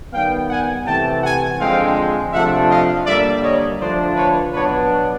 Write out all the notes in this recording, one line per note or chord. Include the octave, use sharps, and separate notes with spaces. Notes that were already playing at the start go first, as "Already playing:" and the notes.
D#3 G3 B3 F5 G5
F#5 G#5
C3 E3 A3 G5 A5
F#5 G#5
D3 F3 G#3 C4 F5 G5
C3 F3 A3 D4 E5 F#5
D#5 F5
D3 G3 A#3 D5 E5
C#5 D#5
D3 F3 A3 D4 C5 D5
B4 C#5
B2 F#3 B3 D4 B4 C#5